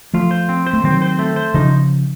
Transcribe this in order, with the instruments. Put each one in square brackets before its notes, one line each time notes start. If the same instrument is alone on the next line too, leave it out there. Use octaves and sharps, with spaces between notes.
[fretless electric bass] F3 A3 [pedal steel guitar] F4
[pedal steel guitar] C5
C4
C5
[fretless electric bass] A3
[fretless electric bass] D#3 F#3 [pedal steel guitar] C4
[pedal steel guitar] C5
A3
C5
[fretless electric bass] C#3 F3 [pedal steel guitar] D#4